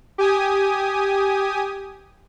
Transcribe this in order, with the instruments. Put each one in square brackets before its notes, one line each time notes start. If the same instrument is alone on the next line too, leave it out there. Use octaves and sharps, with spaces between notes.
[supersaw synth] G4 G#5 D#6